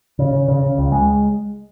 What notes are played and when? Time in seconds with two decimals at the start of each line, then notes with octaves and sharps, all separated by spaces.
0.19 C#3
0.33 C#3
0.48 C#3
0.63 C#3
0.78 C#2
0.92 G#3